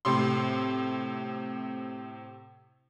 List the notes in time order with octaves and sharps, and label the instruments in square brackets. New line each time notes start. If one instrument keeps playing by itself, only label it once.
[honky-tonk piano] A2 C3 C6